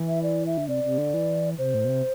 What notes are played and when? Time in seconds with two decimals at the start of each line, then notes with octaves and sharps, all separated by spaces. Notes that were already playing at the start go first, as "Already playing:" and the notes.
Already playing: E3
0.08 E5
0.23 D5
0.46 E5
0.58 D3
0.68 C3 D5
0.84 C3
0.98 D3
1.14 E3
1.58 C3 C5
1.74 A2
1.85 B2
1.89 C3